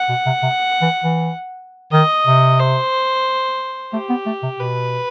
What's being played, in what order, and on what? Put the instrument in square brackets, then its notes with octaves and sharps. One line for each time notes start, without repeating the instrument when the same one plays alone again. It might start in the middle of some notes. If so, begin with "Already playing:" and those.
Already playing: [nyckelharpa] F#5
[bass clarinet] B2
C3
C3
E3
E3
[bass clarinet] D#3 [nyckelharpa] D#5
[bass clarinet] C3
[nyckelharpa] C5
[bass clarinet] A3 [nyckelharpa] G4
[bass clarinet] B3
A3
C3
[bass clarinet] B2 [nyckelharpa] B4